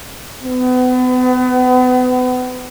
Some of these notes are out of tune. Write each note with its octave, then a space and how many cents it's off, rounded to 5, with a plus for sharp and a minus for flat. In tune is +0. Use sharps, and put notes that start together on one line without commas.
B3 +35